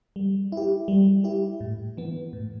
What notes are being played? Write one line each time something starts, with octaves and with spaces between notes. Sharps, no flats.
G3
E4 G4
G3
E4 G4
A2
E3 B3
A2